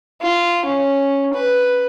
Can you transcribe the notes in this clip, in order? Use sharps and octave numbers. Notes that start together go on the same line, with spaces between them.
F4
C#4
B4